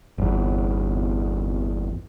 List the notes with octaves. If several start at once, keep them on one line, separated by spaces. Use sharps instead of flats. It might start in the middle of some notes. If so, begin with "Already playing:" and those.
G1 E2